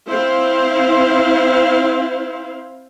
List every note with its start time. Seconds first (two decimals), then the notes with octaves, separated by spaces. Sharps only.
0.11 C4 E4 C5 F5